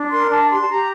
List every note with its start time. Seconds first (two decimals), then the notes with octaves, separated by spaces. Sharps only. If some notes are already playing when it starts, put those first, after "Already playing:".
Already playing: D4
0.11 A#4 C6
0.25 A#5
0.30 D4 A5
0.50 G4 C6
0.60 A5
0.68 G4 A#5